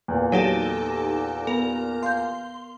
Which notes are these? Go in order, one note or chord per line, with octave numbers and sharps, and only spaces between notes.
E2 A#2
F#3 D#4 G4 A4
B3 A#4
F5 C6 G6